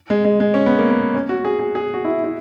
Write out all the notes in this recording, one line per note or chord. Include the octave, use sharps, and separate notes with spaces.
G#3
G#3
G#3
C#4
B3
A#3
B3
C#4
F#4
G#4
G#4
G#4
F#4
E4
E4